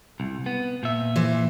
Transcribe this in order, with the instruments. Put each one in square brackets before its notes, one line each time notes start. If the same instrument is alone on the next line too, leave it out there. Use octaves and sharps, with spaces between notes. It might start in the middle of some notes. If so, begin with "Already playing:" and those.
[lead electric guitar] C2
B3
A#2 E5
[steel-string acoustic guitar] E3 C5